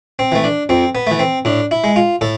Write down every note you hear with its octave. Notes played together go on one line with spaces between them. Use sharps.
C4
E3 A3
D4
F2 C4
B3
E3 A3
C4
A2 D4
E4
G#3
F4
A2 A4